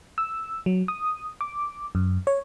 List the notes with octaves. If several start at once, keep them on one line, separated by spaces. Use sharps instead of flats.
E6
F#3
D#6
D6
F#2
C#5